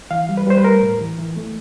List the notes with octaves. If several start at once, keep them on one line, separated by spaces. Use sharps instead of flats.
E3 F5
G3
B4
G3 C5
B4
A3 A#4
A2
E3
E3
A3